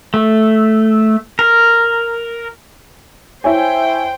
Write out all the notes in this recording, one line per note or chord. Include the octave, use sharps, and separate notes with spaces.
A3
A#4
E4 C5 C#5 G5 G#5